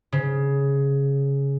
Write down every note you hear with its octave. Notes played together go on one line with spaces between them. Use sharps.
C#3